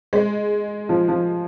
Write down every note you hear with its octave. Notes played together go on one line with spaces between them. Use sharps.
G#3
F3
F3